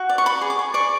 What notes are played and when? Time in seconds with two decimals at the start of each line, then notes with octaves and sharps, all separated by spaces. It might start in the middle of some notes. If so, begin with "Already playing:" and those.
Already playing: F#4
0.09 D5
0.18 C#6
0.26 D5 B5
0.41 G#4
0.50 D6
0.59 G#4
0.74 D5 C#6